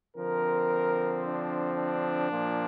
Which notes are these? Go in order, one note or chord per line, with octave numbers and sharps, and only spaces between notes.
D3 F3 C4 A#4
D4
D4
A#2 F3 A#3